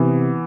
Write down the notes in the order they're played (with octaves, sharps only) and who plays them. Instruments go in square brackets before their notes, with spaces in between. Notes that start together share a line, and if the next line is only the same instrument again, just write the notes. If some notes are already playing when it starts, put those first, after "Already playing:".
Already playing: [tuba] C3 [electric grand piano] E3 B3